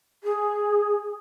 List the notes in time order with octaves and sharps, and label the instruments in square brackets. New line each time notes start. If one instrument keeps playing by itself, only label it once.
[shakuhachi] G#4